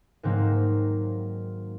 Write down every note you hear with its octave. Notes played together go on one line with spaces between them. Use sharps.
G#2 D#3 F#3 A#3 C4